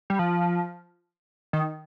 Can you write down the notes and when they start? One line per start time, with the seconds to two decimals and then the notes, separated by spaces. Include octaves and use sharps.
0.10 G3
0.19 F3
1.53 D#3